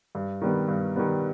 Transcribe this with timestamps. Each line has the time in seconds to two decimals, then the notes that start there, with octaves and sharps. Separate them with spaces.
0.15 G2
0.41 D#3 G3 B3
0.68 G2
0.96 D#3 G3 B3